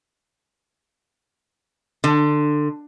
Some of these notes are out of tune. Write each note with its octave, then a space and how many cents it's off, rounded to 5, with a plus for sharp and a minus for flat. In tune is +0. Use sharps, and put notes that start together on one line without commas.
D3 +20